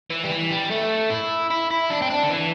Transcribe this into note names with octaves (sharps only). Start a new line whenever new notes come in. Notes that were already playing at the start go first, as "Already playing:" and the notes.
E3
G3
E3
G3
A3
E4
E4
E4
D4
C4
D4
D3
E3